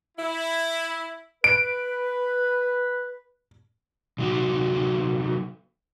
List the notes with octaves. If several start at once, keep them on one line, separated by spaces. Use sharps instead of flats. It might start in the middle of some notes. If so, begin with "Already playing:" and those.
E4
B4 D7
C3 F#3 D#4 F#4